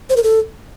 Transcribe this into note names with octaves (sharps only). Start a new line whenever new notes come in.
C5
A#4
A4